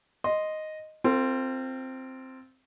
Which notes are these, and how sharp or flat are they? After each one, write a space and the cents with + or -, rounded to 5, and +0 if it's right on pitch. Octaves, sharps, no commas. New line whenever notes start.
D#5 +0 C6 +0
C4 +0 F4 +0 A4 +45